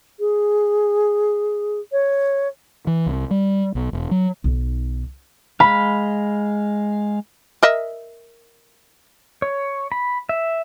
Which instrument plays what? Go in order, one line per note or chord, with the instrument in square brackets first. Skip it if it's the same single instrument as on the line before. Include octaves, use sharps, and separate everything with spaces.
[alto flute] G#4
C#5
[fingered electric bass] E3
C2
G3
B1
E1
F#3
[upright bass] B1 D#3
[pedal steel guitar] G#3 F5 [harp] B5
[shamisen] A#4 D#5 E5
[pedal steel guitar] C#5
B5
E5